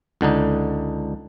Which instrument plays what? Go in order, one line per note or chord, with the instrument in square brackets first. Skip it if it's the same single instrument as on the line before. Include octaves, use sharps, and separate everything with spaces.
[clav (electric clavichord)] C#2 D3 D4 D#4